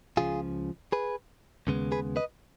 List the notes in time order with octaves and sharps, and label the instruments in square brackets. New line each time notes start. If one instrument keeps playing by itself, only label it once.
[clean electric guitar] C#2 C#3 F3 F4 G#4
G#4 B4
D#2 C#3 G#3 B3
G#4 B4
B4 D#5